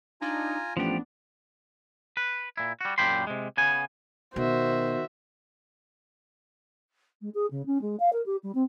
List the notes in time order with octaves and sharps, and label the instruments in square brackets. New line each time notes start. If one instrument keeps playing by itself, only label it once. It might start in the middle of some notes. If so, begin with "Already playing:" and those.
[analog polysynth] D4 D#4 [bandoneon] F4 G#5 A#5
[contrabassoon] A1 [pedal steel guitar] F3 G4 [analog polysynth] B3 D4
[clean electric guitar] B4
A#2 E4
G3 F#4
F#2 A#2 G4 G5 B5 C6
C3 G#3
C#3 B3 G#5
[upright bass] B2 [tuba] D#3 [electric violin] F#4 E5 [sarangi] C5
[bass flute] G#3
G#4
C#3
C#4
G#3
F5
A#4
G4
G3
C4